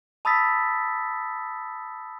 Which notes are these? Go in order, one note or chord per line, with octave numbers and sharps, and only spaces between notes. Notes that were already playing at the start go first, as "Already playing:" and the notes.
A5 B5 D#6 E6 A6 B6